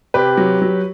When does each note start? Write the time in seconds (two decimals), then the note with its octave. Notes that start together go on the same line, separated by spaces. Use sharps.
0.14 C3 G4 B4
0.37 F#3
0.62 F#3